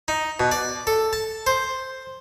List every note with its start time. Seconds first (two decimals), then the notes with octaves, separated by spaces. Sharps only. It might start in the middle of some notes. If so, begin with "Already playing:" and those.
0.08 D#4
0.40 B2
0.51 D5
0.87 A4
1.13 A5
1.47 C5